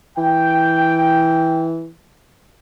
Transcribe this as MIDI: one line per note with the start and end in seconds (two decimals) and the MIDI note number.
0.17 1.88 52
0.17 1.68 79